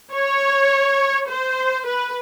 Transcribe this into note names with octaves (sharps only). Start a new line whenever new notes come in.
C#5
C5
B4